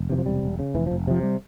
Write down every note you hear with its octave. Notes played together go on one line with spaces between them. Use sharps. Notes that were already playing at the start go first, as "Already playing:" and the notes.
Already playing: F1
C3 E3
F3
E1 G3
E1
C#3
F1 E3
F3
F1
C3 F3
G3